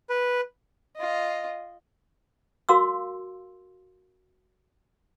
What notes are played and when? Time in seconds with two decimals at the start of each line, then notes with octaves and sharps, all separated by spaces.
0.10 B4
0.97 F4 D#5
2.69 F#4 A#4 F5 C6 D6 E6